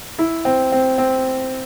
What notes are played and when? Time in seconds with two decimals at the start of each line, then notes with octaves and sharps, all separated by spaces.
0.19 E4
0.45 C4
0.72 C4
0.98 C4